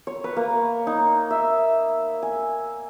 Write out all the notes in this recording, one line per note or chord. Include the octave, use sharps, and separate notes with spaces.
C#5
B4
A#3
D#4
E5
G#5